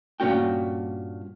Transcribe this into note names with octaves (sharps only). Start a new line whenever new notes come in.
G2 A#2 A#3 C#4 F#4 G5